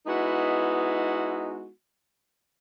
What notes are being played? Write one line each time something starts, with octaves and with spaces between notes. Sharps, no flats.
G#3 B3 D#4 E4 F#4